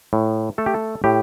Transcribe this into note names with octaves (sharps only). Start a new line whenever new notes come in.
A2
A3 A4
G4
A4
A2 G4